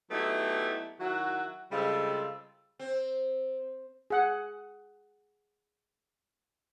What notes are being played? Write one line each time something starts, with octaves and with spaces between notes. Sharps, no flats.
F#3 A3 B3 D#4 E4 G4
D#3 F#3 E4 F#4
C#3 G3 G#3 C4 F4 A4
C4
G#4 F#5